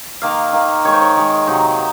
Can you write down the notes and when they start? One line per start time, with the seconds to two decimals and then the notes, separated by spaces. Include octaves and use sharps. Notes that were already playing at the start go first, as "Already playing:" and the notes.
0.22 D#3 A#3 F5
0.53 D#3 A#3
0.84 D#3 G#3 C#5
0.93 C5
1.02 C#5
1.16 D#3 G#3
1.47 C3 D#3 F#3 A#3 D#4